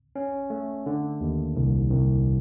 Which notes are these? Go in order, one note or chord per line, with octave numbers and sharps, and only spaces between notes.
C#4
A3
D3
D#2
C2
C2